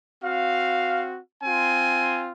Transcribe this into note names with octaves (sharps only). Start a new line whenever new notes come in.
C4 F#4 F5
C4 F4 G#5